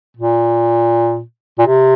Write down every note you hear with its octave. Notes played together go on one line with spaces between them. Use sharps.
A#2
A#2
C3